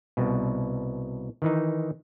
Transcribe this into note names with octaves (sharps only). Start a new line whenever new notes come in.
C2 B2
D#3 E3 D#4